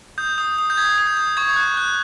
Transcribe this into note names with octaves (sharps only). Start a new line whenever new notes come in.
D#6 G6
D#6
D#6
G6
D#6 G#6
D#6
G6
D#6
C#6 G#6
F#6
F#6